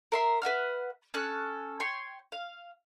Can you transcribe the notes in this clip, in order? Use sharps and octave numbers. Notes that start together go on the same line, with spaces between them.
A#4 E5 C6
B4 E5 F#5 F6
C#4 A4 F#6
C#5 G5 C6
F5